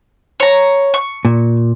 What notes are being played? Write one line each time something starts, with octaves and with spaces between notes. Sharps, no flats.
C#5 A#5
C#6
A#2